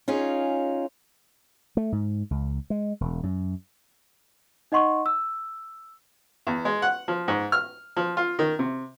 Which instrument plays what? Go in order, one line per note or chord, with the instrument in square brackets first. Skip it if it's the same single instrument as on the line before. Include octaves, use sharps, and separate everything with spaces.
[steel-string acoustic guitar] C#4 D#4 F4 G#4
[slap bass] A3
G#2
C#2
G#3
E1
F#2
[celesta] D#4 D#5 F#5 C6 C#6
E6
[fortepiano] E2
G#3
F#5
F3
G#2
F6
F3
F4
D#3
C3